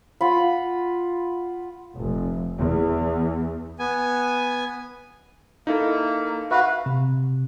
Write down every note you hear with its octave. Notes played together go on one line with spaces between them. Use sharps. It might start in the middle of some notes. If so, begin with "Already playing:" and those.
F4 F#5 B5
F1
E2
B3 G#5
A#3 D#4 E4 A4
F#4 B4 E5 F5
C3